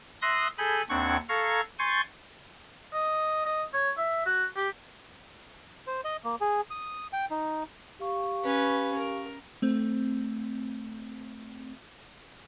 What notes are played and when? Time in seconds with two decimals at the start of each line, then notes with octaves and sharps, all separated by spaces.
0.22 E5 C6 D#6 F#6 A#6
0.58 G#4 A4 G#5 B5 G6
0.89 D#2 C4 D4 F#5 C#6 G#6
1.29 A4 F5 A#5 C#6 G#6
1.79 G#5 C6 C#6 G6 A6
2.93 D#5
3.46 D#5
3.73 C#5
3.97 E5
4.26 F#4
4.56 G4
5.87 C5
6.04 D#5
6.24 A#3
6.41 G#4
6.70 D#6
7.13 G5
7.30 D#4
7.99 G4 F5 C#6
8.44 C#4 B4
8.98 A#4
9.62 A3 C4